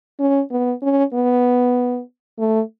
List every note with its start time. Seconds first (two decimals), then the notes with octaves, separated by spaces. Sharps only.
0.20 C#4
0.51 B3
0.82 C#4
1.14 B3
2.39 A3